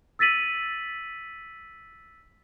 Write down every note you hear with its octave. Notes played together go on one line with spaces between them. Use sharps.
E6 A6 B6 D#7 F#7